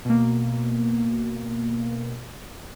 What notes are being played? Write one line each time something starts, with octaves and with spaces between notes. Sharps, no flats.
B2 A#3